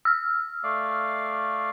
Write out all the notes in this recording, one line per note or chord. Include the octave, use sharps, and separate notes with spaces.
E6 F6
A3 D5 F5